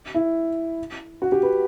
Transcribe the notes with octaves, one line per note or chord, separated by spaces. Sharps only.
E4
F#4
G4
B4